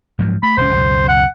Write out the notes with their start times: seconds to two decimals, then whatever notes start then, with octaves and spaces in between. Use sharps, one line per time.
0.19 G#2 F3 F#3
0.43 A3 B5
0.57 D#1 C#2 C#4 C5
0.73 C#2 F#2 B2
1.08 F#5